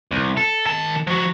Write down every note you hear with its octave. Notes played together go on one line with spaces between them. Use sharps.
C2
A4
D#3 A5
F3 F#4